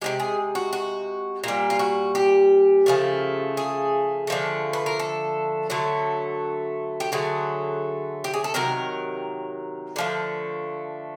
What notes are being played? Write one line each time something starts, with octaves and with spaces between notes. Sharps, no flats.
C3 D#3 G#3 G4
G#4
F#4
F#4
A#2 G3 F4
F4
F#4
G4
C#3 F3 A3
G#4
D3 F3 A3
B4
A#4
A4
D3 F#3 A3
G4
D3 F#3 A3 G#4
G4
G#4
A4
C3 D#3 F#3 A#4
D3 F3 A3